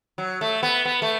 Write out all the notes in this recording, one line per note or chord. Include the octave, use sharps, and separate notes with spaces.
F#3
A3
B3
B3
A3